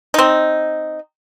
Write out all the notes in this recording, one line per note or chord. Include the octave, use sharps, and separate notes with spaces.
C4 D#4